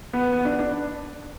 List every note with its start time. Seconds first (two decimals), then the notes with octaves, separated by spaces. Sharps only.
0.13 B3
0.32 B3
0.45 D4
0.59 D4